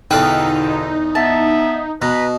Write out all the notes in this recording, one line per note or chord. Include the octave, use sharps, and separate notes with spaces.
E2 B2 D3 D#4 A4 B4 F5 G5
B3 E5 A5
B2 B4 A#5